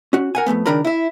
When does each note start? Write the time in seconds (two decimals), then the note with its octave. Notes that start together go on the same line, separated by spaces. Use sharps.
0.13 C#4 F#4
0.35 A#4 F#5 G#5
0.46 F2 G#2 A3 B3
0.66 C#2 D#3 D4 A#4 A#5 B5
0.85 E4 E5